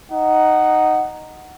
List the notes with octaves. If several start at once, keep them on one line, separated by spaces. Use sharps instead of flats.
D#4 F#5